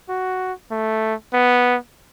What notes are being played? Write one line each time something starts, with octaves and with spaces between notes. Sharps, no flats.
F#4
A3
B3